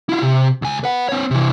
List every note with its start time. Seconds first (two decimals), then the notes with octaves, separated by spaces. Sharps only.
0.09 E4 F4
0.22 C3
0.62 C#2 G#5
0.84 B4 F#5
1.09 C4 C#5
1.31 C3 E3